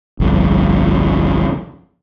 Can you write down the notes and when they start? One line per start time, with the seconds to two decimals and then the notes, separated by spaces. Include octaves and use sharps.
0.20 G1 C2 F2